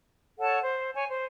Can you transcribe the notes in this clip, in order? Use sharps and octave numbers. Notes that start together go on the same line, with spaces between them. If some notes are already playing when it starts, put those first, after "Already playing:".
A4 C#5 F#5 A5
C5
C#5 G#5
C5